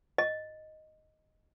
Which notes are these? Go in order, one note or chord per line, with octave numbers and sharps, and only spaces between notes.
D#5